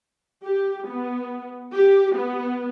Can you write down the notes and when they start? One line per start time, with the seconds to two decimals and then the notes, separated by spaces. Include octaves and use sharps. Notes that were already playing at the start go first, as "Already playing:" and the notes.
0.44 G4
0.88 B3
1.74 G4
2.15 B3